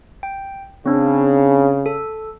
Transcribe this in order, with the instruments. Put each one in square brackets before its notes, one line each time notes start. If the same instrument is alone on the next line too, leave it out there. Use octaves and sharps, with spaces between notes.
[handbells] G5
[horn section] C#3 [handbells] C4 D4
[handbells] A4